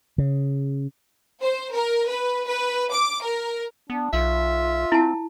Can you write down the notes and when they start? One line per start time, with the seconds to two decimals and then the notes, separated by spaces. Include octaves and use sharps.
0.18 C#3
1.43 C5
1.74 A#4
2.08 B4
2.48 B4
2.92 D6
3.24 A#4
3.90 B3 D4
4.13 B1 F4 E5
4.92 C4 E4 A5